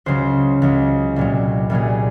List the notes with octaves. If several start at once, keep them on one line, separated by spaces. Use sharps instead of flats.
C#2 C#3 F#3 C5
C#2 C#3 F#3
C2 A#2 F#3
C2 A#2 F#3 G#4